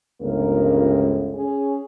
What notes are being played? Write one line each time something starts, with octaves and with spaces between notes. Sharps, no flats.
G1 C#2 A#3 A#4
C#4 G#4